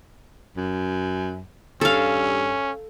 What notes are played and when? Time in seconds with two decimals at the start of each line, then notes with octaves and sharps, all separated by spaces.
0.57 F#2
1.81 G2 C#4 A4 F5